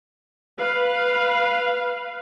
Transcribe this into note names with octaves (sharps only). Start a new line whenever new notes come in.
B4 F5